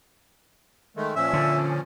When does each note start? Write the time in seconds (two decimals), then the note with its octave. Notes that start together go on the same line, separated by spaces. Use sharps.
0.97 D#3 G#3 A3
1.16 A#2 F3 C#4 E5
1.33 D3